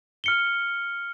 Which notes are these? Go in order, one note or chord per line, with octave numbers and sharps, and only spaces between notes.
F6 C#7 G7